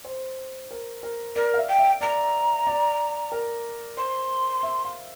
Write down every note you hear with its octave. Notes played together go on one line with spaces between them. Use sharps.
C5
A#4
A#4
A#4 D5
F5
E5
G5
E5
D5 A#5
D5
A#4
C5 C6
E5
F5